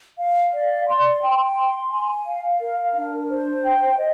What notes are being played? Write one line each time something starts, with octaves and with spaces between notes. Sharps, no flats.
F5
D5
C6
G5
C6
G#5
F5
A#4
D4
C5
G5
D#5